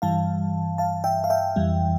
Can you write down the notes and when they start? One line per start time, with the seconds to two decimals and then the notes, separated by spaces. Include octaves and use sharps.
0.02 G2 E3 G3 F5 A5
0.78 F5 A5
1.04 E5 G5
1.24 F5
1.30 E5 G5
1.56 F2 E3 G3